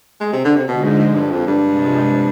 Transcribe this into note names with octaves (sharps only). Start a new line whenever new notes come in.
G#3
C3
D3
C3
B2 D3 F3 G#3
G#2
G#2
G2
F2
G2
C3 F3 G#3